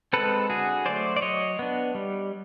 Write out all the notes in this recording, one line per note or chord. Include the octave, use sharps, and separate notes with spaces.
G#3 C4 A4 B4
D3 F#4 G#4
F#3 A3 C5 D5
D5
F#3 C#5 D#5
B3 D4
G3